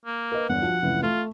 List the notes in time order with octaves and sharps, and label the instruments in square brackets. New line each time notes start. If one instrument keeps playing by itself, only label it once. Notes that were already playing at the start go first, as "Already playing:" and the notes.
[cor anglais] A#3
[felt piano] A#4 B4 D#5
[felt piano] G1 E2 [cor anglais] F#5
[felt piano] F3 F#4
F1 C#2 E3
[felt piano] A3 [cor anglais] F4